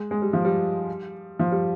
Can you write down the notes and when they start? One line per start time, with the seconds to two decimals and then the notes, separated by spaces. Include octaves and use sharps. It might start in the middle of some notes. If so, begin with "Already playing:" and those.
Already playing: G#3
0.11 G#3
0.22 G3
0.33 F3
0.45 G3
1.39 F3
1.52 G3